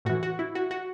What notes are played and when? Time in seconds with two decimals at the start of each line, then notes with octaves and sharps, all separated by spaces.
0.05 A2 E3 F#4
0.23 F#4
0.39 E4
0.55 F#4
0.71 F#4